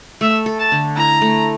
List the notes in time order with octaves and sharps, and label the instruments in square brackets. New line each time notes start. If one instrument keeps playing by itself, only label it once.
[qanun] A3 [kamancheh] E5
[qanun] A4
[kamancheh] A5
[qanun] D3
[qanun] E4 [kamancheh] A#5
[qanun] A3